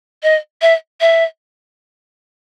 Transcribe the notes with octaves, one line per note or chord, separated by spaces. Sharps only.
D#5
E5
E5